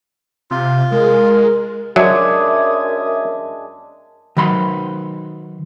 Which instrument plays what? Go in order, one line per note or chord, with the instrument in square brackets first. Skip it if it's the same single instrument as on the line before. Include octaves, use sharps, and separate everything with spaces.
[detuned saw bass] C3 [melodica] F4
[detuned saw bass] G#3 [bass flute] A#4
[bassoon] F#2 [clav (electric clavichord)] F#3 [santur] G#3 D4 D#5 [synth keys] E5 D#6 G#6
[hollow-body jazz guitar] D#3 F#3 B5 C6